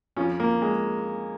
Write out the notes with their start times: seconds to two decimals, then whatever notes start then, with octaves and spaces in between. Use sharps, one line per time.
0.16 F2 F3 C#4
0.40 A#3
0.62 G#3